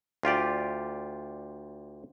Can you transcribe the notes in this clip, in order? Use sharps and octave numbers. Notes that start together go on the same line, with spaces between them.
D2 F4 G4 D5